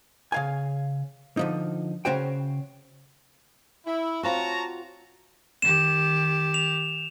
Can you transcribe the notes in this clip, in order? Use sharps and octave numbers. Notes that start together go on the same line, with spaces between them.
C#3 F5 G#5
D3 F3 D#4
C#3 C#4 F#4 C5 G5
E4
C4 F4 F#4 C#5 A5 A#5
D#3 G4 E7
F7